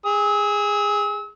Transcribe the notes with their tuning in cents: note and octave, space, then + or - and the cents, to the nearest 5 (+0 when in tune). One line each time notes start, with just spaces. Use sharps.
G#4 -15 E6 -40